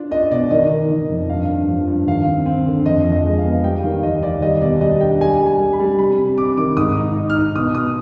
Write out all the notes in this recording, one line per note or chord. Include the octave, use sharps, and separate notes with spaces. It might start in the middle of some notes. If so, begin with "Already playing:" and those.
Already playing: D4 F4 D5
D4 D#5
B2 D5
D#3 D#5
D#3
D#3
F2
G2 F5
G2
F3
G2
D#2 F5
C4
C4
D3
F2 D#5
F2
D#5
G#3
F5
B3
G3 G5
D#3 F5
D#2 D#5
D#2 D5
G3 D#5
B2 D5
G3 D#5
D4 G5
G3 G#5
G3
G#5
G3
B5
G3
C3 B5
C3
C3 D6
D#3 D6
G#2 D#6
D#4
D#4
F6
D#4
B2 D#6
B3 D#6